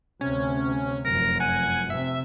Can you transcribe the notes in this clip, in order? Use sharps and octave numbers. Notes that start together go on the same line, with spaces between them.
D2 C3 C#4
F1 F#2 A#4
F#5 G#5
C3 E5